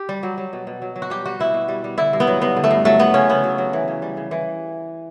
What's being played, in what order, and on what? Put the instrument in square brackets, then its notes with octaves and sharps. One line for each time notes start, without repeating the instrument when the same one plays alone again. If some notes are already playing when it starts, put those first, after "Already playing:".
Already playing: [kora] G4
G3
F#3
F#3
B2
B2
F#3
F#3
F#4
G3 G4
G3 F#4
B2 E4
B2
G3
G3
D3 E4
G2
B3
F#3
G2 B3
D3
A3
G2
F#3 A3
F#3 B3
C#3 C#4
C#3 B3
F#3
F#3
E3
C#3
G3
C#3
E3